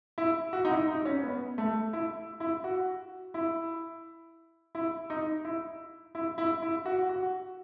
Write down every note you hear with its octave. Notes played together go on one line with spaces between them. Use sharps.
E4
F#4
D#4
E4
D#4
C#4
B3
A3
E4
E4
F#4
E4
E4
D#4
E4
E4
E4
E4
F#4
F#4